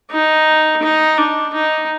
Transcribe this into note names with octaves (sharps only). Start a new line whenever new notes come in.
D#4
D#4
D4
D#4